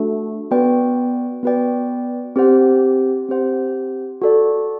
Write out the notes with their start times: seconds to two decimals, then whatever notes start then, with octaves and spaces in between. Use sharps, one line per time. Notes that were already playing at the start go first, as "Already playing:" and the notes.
Already playing: A3 D4 F#4 A4 E5
0.51 B3 F#4 B4 D5 G5
1.43 B3 F#4 B4 D5 G5
2.36 C4 G4 C5 F#5
3.29 C4 G4 C5 F#5
4.22 F#4 A4 D5